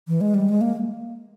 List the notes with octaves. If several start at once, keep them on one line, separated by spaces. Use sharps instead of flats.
E3
G#3
G3
G#3
A#3